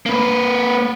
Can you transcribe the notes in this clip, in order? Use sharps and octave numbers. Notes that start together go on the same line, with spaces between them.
A#3 B4